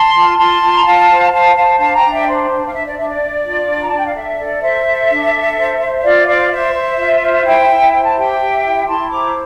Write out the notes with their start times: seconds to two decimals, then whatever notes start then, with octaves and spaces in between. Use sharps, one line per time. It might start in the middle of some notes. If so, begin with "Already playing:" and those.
Already playing: A5 C6
0.14 F4
0.37 F4 A5 C6
0.61 F4
0.74 A#5
0.84 F4 F5 A5
1.08 C5
1.31 C5 F5 A5
1.55 C5 F5 A5
1.78 D4 F5 A5
1.94 G5 A#5
2.02 D4
2.10 E5 G5
2.26 C5
2.50 D4
2.67 F5
2.72 D4 E5
2.85 D5
2.96 D4 E5
3.08 D5
3.20 D4
3.44 F4
3.67 D4
3.81 A#5
3.89 D4 A5
3.98 G5
4.06 F5
4.14 A4 E5
4.38 A4 D5
4.61 C5 E5
4.86 A4
5.08 D4
5.33 A4
5.56 C5
5.79 C5
6.02 F4 D5 F5
6.27 C5 D5 F5
6.50 C5 E5
6.73 C5
6.97 F4
7.20 C5
7.44 E4 E5 G5
7.68 E4
7.92 C5 G5
8.03 A5
8.15 G4 E5 G5
8.38 G4
8.63 E4
8.86 E4 A5 C6
9.09 C5 A#5 D6